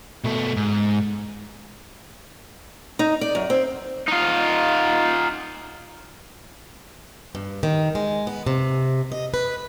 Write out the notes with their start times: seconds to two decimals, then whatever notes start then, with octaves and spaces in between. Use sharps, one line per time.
0.24 B2 A3
0.57 G#2
2.99 D#4
3.21 D5
3.35 F#2
3.50 C4
4.08 D#4 F4
7.35 G2
7.63 D#3
7.95 G#3
8.27 B3
8.46 C3
9.12 D#5
9.34 B4